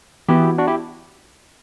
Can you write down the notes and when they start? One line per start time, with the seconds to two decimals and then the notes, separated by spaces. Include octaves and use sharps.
0.29 E3 B3 E4 F#4 G4
0.58 D4 F#4
0.67 E4 G4